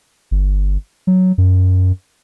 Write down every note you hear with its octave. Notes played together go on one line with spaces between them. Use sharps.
G1
F#3
F#2